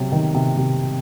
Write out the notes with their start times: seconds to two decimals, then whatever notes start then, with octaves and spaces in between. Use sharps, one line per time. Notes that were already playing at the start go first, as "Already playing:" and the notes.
Already playing: C3 F#3
0.12 D#3
0.34 C3
0.57 C3